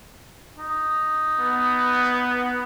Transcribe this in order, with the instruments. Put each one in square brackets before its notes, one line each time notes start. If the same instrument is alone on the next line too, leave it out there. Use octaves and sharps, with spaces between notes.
[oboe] D#4
[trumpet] B3